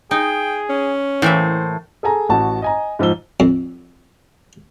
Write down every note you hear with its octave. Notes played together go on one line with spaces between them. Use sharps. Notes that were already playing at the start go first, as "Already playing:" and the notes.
D#4 G#4 G5
C#4
A2 E3 A#3 C5 E5
G#4 A4 G#5 A#5
A1 F#4 A5
D#5 G#5 A#5
G#2 F3 C5 E6 G7
F2